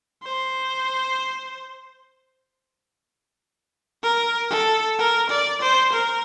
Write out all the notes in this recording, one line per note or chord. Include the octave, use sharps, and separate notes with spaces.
C5
A#4
A4
A#4
D5
C5
A#4